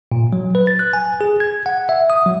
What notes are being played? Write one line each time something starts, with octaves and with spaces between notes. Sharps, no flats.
A#2
F#3
B4
A6
F#6
G#5
G#4
G#6
F#5
E5
D#6
F#3